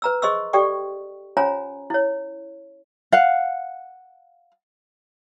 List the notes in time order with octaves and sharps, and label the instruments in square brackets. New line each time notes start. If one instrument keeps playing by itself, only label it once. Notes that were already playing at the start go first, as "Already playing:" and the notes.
[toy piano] B4 A#5 E6
G#4 C5 D#5 C6 C#6 E6
G4 A4 D5 G5 C#6
C#4 F4 C5 C#5 G#5 A#5
E4 C#5
[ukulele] F5 F#5